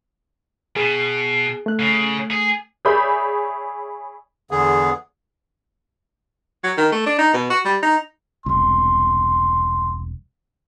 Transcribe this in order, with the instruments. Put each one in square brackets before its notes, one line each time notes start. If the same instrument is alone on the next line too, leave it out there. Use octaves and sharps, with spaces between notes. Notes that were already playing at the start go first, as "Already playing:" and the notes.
[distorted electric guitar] B2 [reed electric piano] G#4
[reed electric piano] A3 F#6
[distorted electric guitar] C#3
G#4
[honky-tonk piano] G#4 C#5 D5 E5 B5 G6
[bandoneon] E2 D3 B3 G#4
[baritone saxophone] F#3
D#3
A3
D4
D#4
B2
F#4
G3
D#4
[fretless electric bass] E1 C2 [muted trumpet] C6